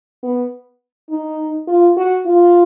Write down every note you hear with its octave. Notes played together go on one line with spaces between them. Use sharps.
B3
D#4
F4
F#4
F4